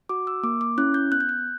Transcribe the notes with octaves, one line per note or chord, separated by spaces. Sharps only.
F#4 D6
E6
A#3 D6
D6
C#4 E4 F#6
G6
B3 F#6
G6
F#6